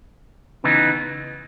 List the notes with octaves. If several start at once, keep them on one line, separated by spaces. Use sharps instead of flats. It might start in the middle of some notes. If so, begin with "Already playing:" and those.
C#3 E3 B3 D#4